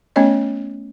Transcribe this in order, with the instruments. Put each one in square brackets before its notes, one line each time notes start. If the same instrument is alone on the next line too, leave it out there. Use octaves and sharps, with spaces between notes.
[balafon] A3 B3 C#4 C#5 D#5